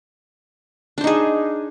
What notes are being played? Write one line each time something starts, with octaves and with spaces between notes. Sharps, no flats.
D4 D#4 G#4 C5